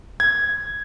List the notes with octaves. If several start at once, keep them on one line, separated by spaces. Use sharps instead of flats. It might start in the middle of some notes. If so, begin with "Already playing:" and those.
G#6